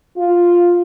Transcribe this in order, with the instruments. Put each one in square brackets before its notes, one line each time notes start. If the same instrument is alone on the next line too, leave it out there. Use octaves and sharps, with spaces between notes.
[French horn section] F4